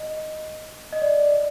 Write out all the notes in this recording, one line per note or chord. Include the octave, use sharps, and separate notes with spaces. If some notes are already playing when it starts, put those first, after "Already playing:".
Already playing: D#5
D#5
D5